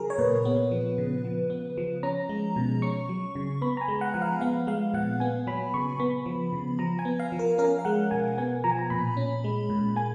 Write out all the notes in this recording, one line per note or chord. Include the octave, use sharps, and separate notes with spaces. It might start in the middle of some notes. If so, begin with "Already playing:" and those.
Already playing: C#3 F#3 G#4 A#4
C#5
A#2 B4
B3
F3
C#3
F3
B3
F3
C#4 A#5
G#3
B2
C#4 C#6
F#3
C#3
B3 B5
A#5
G#5
G#3
F#5
F3 F#5
F5
B3 F5
G#3 F5
A#2 F#5
B3 G#5
F#3 B5
C#3 C#6
B3 B5
F3
C#3
F3 A#5
G#5
B3
F5
F3
A#4
C#4 A#4
F5
G#3 F#5
B2 G#5
B3 G#5
F3 A#5
G#5
A#5
A#2 B5
C#4
G#3
A#2
A#3 G#5